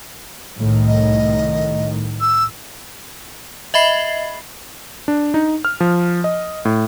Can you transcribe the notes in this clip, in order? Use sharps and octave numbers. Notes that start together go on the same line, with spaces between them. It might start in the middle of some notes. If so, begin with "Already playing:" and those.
C2 A2 D#3
D#5
E6
D#5 E5 B5 C7
D4
D#4
F6
F3
D#5
A2